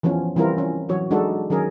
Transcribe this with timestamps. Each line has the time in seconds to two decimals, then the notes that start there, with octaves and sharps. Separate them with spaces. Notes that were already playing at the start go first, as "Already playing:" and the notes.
0.03 E3 F3 B3 C#4
0.36 E3 G3 C4 E4 F4 A#4
0.58 C#4
0.89 E3 F#3 F#4 C#5
1.11 G#3 D4 D#4 F#4 A4
1.50 D#3 F#3 C#4 G#4 A#4